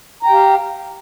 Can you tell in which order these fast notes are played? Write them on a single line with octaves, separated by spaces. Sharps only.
A#5 G5 G4 F5